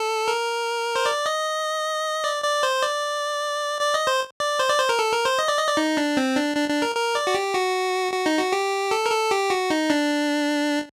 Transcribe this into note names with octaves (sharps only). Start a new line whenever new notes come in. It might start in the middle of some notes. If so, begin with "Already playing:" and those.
Already playing: A4
A#4
C5
D5
D#5
D5
D5
C5
D5
D5
D#5
C5
D5
C5
D5
C5
A#4
A4
A#4
C5
D#5
D5
D#5
D5
D#4
D4
C4
D4
D4
D4
A#4
A#4
D5
F#4
G4
F#4
F#4
D#4
F#4
G4
A4
A#4
A4
G4
F#4
D#4
D4